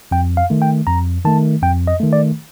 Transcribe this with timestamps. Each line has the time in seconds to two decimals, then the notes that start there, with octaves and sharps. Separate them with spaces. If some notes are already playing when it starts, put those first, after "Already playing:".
0.11 F2 G5
0.37 F5
0.50 D#3 A3
0.62 G5
0.87 F2 A#5
1.25 D#3 A3 A5
1.62 F2 G5
1.87 D#5
2.00 D#3 A3
2.13 D5